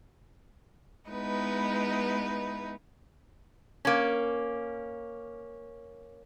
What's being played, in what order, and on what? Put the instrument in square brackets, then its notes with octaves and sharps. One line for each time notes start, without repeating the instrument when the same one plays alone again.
[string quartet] G#3 B3 D#4 E4 B4
[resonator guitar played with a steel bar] A#3 C#4